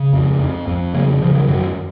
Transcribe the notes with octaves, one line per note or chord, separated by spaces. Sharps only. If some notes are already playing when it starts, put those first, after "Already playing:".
Already playing: C#3
F2
F2
F2
C#3 F#3 A#3
C#3 F3
D#3 F#3
F#2 D#3 F#3